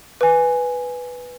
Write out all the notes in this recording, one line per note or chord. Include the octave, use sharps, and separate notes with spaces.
B4 G#5